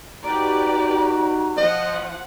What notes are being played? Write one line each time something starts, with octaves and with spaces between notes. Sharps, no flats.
D#4 F#4 G4 B4 D5 A#5
F3 F4 D#5 F#5